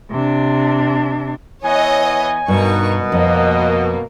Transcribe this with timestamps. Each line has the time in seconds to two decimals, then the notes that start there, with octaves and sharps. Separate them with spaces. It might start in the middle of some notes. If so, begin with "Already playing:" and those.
0.11 C3 D4
1.64 E3 B3 C#5 D#5 G#5
2.48 G2 B2 D#4 A#4 C#6
3.12 F2 A#3 D#5